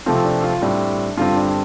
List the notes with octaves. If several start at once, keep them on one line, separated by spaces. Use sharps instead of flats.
C3 F3 A3 C4 F4
D4
F4
A2 G3 C4 D4
G2 D3 G3 C4 F4
D4